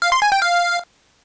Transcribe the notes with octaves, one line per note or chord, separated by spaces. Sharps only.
F5
C6
G#5
G5
F5